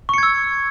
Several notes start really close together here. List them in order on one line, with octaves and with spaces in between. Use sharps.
C#6 C#7 G#6 E6